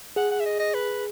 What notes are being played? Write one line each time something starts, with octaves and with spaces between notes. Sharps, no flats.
G#4 F#5
F#5
E5
D#5
D#5
B4